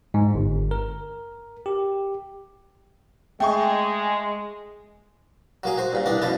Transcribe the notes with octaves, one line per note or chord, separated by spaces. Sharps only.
G#2
G1
A#4
G4
G#3 A3 G#4 G5 C#6
F#3 A#3 G#4
F#4 C5
G2 A#2
C2 G2 D4 F#5
F#2 B2 F3 B3 A5